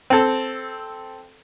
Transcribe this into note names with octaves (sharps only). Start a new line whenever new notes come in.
C4 A4